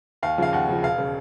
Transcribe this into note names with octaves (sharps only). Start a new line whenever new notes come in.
D#2 F5
C#3 F3 F5
D#2 F#5
C#3 F3
E1 F5
C#3